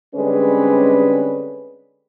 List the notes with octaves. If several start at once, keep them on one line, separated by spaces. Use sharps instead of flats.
D3 G3 G#3 C4 C#4 B4